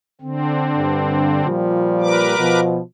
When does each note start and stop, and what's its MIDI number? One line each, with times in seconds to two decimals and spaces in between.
0.21 1.47 50
0.21 1.47 60
0.77 1.43 43
1.45 2.34 46
1.45 2.34 53
1.45 2.34 55
2.01 2.60 70
2.01 2.60 71
2.01 2.60 86
2.39 2.79 47
2.39 2.79 53